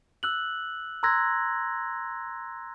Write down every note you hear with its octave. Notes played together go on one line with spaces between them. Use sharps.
E6 F#6 F#7
A#5 C6 E6 F#6 G#6 A#6